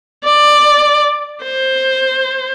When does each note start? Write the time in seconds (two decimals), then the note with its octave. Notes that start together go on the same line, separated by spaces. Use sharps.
0.24 D5
1.44 C5